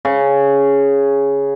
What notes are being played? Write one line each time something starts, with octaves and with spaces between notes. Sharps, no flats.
C#3